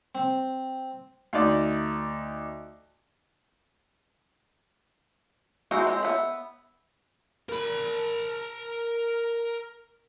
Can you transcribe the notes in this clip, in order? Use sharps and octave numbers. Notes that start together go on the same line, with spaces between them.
C4
D2 D#4 D5
G#3 C4 D#4 E4 F#4
G#3 C4
B3 E5
A#4 B5